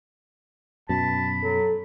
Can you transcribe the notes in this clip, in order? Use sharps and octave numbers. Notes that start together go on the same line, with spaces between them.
F#2 B2 A5 B5
F#3 A4